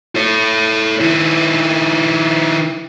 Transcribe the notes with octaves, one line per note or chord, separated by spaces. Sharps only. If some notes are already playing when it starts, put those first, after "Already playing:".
A4 C#5
D#3 E4